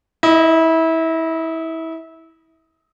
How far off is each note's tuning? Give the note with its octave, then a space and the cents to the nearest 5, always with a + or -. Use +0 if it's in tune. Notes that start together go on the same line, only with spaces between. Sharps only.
E4 -25 D#5 +10